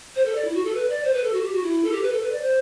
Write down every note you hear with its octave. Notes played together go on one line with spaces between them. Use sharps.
C5
A4
D5
E4
F#4
A4
B4
D5
C5
B4
A4
F#4
G4
F#4
E4
A4
G4
B4
A4
B4
D5
C5